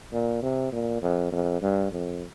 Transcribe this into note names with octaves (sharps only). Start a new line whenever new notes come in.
A#2
C3
A#2
F2
F2
G2
F2